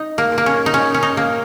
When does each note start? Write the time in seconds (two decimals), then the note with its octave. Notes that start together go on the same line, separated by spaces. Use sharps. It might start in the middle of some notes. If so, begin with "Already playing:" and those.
Already playing: D#4
0.18 A#3
0.32 A#2
0.38 A#3
0.46 C#4
0.66 D#4
0.74 A#2 C#4
0.94 C#4
1.03 D#4
1.17 A#3